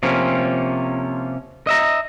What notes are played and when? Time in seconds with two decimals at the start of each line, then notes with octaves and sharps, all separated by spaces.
0.03 C3 F3 A#3 C#4
1.67 D#5 E5 A#5